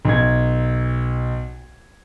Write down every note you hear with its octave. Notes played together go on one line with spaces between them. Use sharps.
B1 G#6